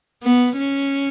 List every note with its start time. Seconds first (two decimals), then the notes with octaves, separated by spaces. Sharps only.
0.23 B3
0.57 C#4